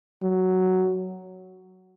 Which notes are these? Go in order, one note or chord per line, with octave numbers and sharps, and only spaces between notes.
F#3